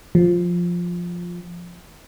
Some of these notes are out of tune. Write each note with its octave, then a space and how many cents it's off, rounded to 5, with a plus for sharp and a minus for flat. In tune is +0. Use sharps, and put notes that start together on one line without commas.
F3 +5